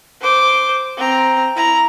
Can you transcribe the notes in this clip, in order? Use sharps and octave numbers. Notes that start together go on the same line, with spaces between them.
C5 D6
C4 A#5
E4 A#5